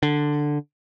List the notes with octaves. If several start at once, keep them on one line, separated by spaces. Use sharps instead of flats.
D3